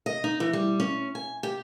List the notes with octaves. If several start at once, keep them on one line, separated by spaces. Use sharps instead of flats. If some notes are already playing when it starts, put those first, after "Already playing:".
D#5
D#4
E3
G3
C#4
G#5
G4